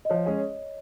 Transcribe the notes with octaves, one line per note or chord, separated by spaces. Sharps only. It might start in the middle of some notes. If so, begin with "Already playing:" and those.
D#5
F3 C#5
G#3 C#4 G#4